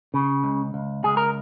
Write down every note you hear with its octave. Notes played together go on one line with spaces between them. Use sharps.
C#3
C#2
C#2
C#2 G#4
A#4